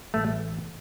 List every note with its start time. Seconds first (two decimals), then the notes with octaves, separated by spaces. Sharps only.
0.14 A1 A3